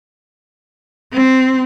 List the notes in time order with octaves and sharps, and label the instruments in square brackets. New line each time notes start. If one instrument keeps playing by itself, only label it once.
[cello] C4